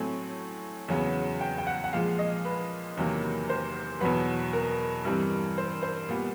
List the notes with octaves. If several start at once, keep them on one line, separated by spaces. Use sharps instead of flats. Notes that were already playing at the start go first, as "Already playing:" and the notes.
Already playing: A2 F#3 A3 C4 G#5
E2 C#3 F#3 B3
G5
G5
F#5
F#5
A#2 F3 G#3 F5
D#5
B4
E2 C3 D#3 F#3 A#3
C5
E2 B2 F#3 B3 B4
A#4
G2 E3 G3 C4
C5
C5
A#2 G3 B3